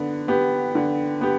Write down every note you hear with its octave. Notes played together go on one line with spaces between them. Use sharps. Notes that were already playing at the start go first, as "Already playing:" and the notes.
Already playing: D3 B3
B3 G4
D3
B3 G4